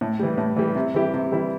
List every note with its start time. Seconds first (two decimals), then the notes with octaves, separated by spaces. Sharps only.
0.01 A2
0.19 E3 G3
0.38 A2
0.56 E3 G3
0.75 C3
0.94 E3 G3 E4 G4
1.14 C3
1.32 E3 G3 E4 G4